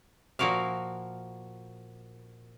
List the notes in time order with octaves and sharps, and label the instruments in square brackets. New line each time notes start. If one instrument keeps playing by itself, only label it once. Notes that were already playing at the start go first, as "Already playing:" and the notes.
[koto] A#2 F3 F#4 A#4 F5